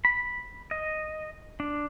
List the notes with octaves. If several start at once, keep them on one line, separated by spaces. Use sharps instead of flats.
B5
D#5
D4